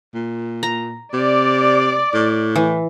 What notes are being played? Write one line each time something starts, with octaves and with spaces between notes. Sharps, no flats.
A#2
A#5
C3 D5
A2
E3